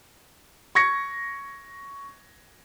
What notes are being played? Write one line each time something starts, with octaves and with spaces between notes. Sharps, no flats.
C#6 G#6 A#6 C#7